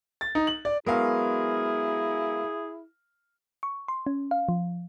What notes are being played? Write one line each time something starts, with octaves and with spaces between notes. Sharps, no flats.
A6
D#4
F#7
D5
F#3 G#3 B3 E4 G#4 A#4 F5
C#6
C6
C#4
F5
F3